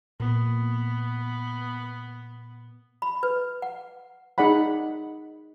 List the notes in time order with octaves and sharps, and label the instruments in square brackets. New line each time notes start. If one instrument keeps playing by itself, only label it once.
[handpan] A#2 [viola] B3
[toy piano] B5
B4
F#5
[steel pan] D#4 G#4 D5 F#5 B5